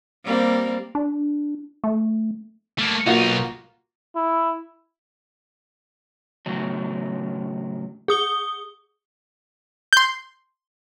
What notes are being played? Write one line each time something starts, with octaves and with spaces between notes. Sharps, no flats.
G3 A#3 C4
D4
A3
A3 A#3
B1 A#3 D#4 F4 F#4
E4
A2 C#3 F#3
G#4 D#6 G7
C6 G6